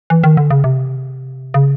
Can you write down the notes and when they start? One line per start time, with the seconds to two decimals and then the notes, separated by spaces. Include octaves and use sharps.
0.10 E3
0.24 D#3
0.37 D3
0.50 C#3
0.64 C3
1.54 C#3